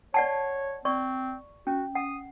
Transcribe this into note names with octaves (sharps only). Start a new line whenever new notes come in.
C#5 D5 F#5 A5
C4 D5 C#6
C#4 F#4
F#5 D#6